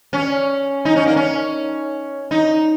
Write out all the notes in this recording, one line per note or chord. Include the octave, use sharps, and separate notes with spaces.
C#4
D#4
C#4
A#3
C#4
D#4